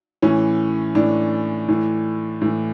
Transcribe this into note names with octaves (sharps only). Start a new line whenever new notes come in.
A2 E3 C#4
A2 E3 D4
A2 E3
A2 E3